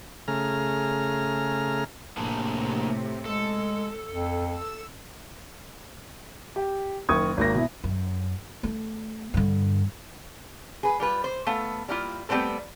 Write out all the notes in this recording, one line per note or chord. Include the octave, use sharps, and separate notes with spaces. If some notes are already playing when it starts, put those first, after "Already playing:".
C#3 A3 G#4 A#5 F6
A2 C3 A#3 D4 G#4
G#3 A4
F2
E6
G4
F#1 D#3 C#6 D#6 G#6
G#1 A#3 A#6
B2 E4
F#2
A3
G2 D3
G#4 B4
G3 F4 B4
C5
A3 B3 A4 F5
G3 A#3 E4 F4
G3 A3 B3 C4 A4